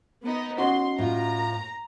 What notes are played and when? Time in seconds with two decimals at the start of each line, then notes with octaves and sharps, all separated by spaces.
0.24 B3 D#4
0.58 C#4 D#4 F#4 C6
0.98 A2 F4 A#5